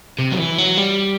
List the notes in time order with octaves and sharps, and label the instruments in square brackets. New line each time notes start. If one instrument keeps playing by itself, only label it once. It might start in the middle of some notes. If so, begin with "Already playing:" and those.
[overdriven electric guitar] C3
F#3
E3
F#3
G3